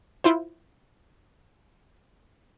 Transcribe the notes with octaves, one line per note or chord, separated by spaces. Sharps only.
E4 F4 C5